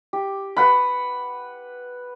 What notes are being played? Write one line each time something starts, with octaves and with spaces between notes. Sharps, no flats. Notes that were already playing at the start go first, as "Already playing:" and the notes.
G4
B4 F#5 B5